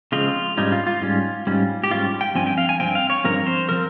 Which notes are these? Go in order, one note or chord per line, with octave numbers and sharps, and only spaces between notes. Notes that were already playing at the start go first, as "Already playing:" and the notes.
C#3 F3 G#3 C4 F4
G#2 G3 C#4 D#4
F4
F4
G#2 G3 C#4
G#2 G3 C#4
G4
G#2 G3 C#4 F4
G5
G2 F3 C4 G#5
G5
F5
G#5
G2 F3 C4 G5
F5
C#5
G2 F3 C4 A#4
C5
F3 C4 A#4